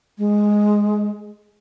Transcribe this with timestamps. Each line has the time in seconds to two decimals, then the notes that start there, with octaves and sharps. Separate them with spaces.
0.18 G#3